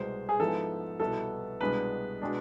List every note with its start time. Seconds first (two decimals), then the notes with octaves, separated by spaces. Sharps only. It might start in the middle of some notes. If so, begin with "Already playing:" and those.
Already playing: C2 B2 G#3 C5
0.29 G#4
0.39 G#2 F3 B3 E4 A4
1.00 C2 B2 B3 E4 A4
1.61 C2 B2 G#3 B3 D4 B4
2.21 B2 G#3 D4